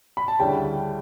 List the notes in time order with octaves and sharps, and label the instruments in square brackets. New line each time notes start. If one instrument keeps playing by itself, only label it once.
[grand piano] B5
A5
[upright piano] D2 C#3 G3 C#4 E4 [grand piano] G5